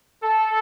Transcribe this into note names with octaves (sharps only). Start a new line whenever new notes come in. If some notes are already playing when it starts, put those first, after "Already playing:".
A4